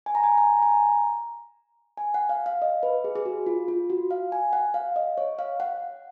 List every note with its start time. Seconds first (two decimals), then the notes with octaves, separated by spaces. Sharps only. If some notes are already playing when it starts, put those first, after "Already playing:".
0.06 G#5
0.15 A#5
0.24 G#5
0.38 A#5
0.62 G#5
0.70 A#5
1.97 G#5
2.14 F#5
2.29 F5
2.46 F5
2.62 D#5
2.83 B4
3.04 G#4
3.16 G#4
3.25 F#4
3.46 F4
3.68 F4
3.90 F#4
4.11 F5
4.32 G#5
4.53 F#5
4.74 F5
4.96 D#5
5.18 C#5
5.39 F5
5.60 F#5